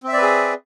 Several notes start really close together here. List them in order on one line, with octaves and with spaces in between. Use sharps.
C4 E5 D5 B4 G#4